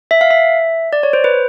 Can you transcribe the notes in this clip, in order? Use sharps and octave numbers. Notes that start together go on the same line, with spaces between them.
E5
F5
E5
D5
C#5
C5
B4